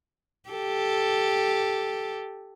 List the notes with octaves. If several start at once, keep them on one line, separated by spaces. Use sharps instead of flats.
G4 A4